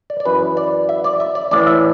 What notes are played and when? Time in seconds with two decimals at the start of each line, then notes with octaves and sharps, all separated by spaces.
0.10 D5
0.20 D5
0.26 F#2 E3 B4
0.57 D5
0.89 E5
1.04 D5
1.20 E5
1.35 D5
1.51 A1 A2 E3 D5
1.67 E5